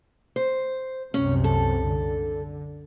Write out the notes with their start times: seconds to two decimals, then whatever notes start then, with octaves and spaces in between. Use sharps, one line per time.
0.36 C5
1.14 C2 F#2 C3 C#4
1.44 A4
1.85 D3